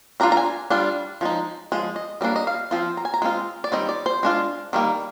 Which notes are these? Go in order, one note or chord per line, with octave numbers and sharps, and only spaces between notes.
G3 D4 F4 A#5
A#5
G#5
G3 D4 F4
F3 G#3 D#4
F3 G#3
D#5
G3 A#3 D4 D#5
D#5
F5
F3 C4 F4
A#5
G#5
A#5
G#3 C4 F4
D5
D#3 G3 C4 D#5
D5
C5
G#3 D4 F4
D#3 G3 A#3